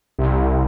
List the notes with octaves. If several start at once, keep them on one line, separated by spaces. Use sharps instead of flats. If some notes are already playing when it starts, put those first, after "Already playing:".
C2